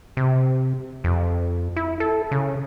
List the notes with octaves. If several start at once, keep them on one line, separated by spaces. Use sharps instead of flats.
C3
F2
E4
A4
C#3